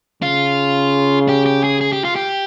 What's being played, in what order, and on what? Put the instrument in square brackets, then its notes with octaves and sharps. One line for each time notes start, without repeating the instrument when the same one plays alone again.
[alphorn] C#3 [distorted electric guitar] F4
[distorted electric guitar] G4
G4
G#4
G#4
G4
F4
G4